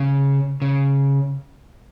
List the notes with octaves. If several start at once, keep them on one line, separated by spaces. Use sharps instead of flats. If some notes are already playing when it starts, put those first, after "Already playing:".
Already playing: C#3
C#3